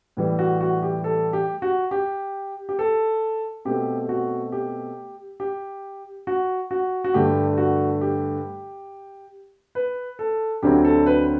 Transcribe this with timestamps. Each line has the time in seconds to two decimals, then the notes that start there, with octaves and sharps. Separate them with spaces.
0.17 A2 E3 G3
0.39 F#4
0.61 F#4
0.83 G4
1.04 A4
1.33 G4
1.62 F#4
1.91 G4
2.69 G4
2.79 A4
3.65 B2 A3 C4 G4
4.09 F#4
4.52 G4
5.40 G4
6.27 F#4
6.71 F#4
7.04 F#4
7.14 G2 D3 A3 G4
7.58 F#4
8.01 G4
9.75 B4
10.19 A4
10.63 D2 D3 F#3 C4 G4
10.85 A4
11.06 B4